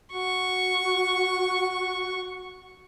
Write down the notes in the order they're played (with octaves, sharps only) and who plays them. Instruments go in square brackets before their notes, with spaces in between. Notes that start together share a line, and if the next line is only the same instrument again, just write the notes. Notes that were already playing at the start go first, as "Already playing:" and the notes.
[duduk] F#4 [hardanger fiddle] C#6